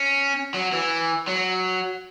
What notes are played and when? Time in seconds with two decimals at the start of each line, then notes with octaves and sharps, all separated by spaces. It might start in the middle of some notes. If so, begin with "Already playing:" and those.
Already playing: C#4
0.54 F#3
0.72 E3
1.27 F#3